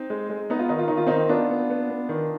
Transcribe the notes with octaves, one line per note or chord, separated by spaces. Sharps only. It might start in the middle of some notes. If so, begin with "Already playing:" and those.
Already playing: C4 D#4
G#3
G#3
B3 D#4
F4
D#3 D#4
F4
D#3 D#4
F4
D#3 C4 D#4
B3 D4 F4
B3
B3
B3
D#3